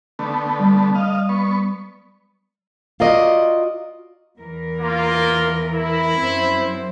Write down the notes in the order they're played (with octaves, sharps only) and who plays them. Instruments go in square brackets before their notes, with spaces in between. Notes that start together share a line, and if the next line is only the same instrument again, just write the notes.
[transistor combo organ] D3 A3 B3
[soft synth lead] G3
[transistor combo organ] D#5 F5
B3 C#6
[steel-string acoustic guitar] F4 F#4 A#4 D5 D#5
[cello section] E2 E3 A#4
[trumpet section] A#3 F4
E4
[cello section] F#2 C4 C5